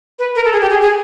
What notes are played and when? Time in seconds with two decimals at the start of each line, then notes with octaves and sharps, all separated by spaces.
0.19 B4
0.36 A#4
0.45 A4
0.53 G#4
0.61 G4
0.70 G#4
0.81 G#4